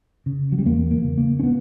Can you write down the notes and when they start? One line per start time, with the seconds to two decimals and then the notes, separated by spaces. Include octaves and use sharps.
0.26 C#3
0.52 F#3
0.58 G3
0.65 E2 A#3
0.91 A#3
1.04 C#3
1.18 A#3
1.39 C#4
1.43 B3